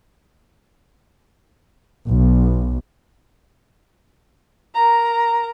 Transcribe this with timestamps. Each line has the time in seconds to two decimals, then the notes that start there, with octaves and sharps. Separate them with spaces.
2.07 B1
4.75 A#4 A#5